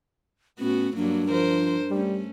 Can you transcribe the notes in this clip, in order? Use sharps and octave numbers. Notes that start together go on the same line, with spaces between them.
A2 B3 C#4 F#4
G2 F#3 A#3 D4
F3 A#4 C5
G3 A3 C#4